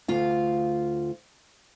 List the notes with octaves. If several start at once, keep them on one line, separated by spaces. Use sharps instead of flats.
D2 F4 F5